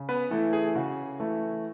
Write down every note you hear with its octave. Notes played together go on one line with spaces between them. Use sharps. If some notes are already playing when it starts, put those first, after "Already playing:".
Already playing: C#3
B3 B4
E3 A3 E4 A4
G#4
C#3 F#4
E3 A3 E4